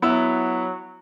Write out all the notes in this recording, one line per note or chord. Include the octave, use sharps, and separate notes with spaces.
F#3 B3 E4 E6